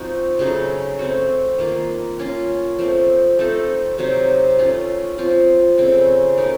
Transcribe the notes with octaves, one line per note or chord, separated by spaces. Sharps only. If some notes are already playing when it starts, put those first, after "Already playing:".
Already playing: F3 C4 D#4 F#4
C#3 F#3 A3 D#4
A3 C4 F#4
D#3 A#3 F4
A#3 C#4 F4
F3 A3 C4
A3 C4 D#4 A4
C3 F#3 C4 D#4
A3 C#4 F4
F3 C4 F4
C#3 A3 C4
A3 D#4 A#4